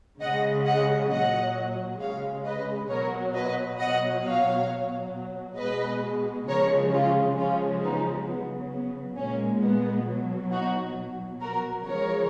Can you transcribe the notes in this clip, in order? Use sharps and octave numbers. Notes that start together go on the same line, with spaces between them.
C#3 G#3 D#5 F#5
D#5 F#5
A#2 F#3 D#5 F#5
C#3 G#3 C#5 F5
B4 D#5
B2 F#3 A#4 C#5
B4 D#5
B2 F#3 D#5 F#5
C#5 F5
B2 F#3
B2 G#3 B4 D#5
C#3 F3 G#3 A#4 C#5
C#4 F4
C#3 F3 G#3 C#4 F4
B3 D#4
C#3 F#3 B3
B3
A#2 G#3 A#3 C#4
B3
B2 F#3
D#4 F#4
B2 F#3
F#4 A#4
C#3 F3 G#3 A#4 C#5